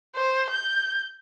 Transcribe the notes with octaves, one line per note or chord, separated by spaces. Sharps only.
C5
G6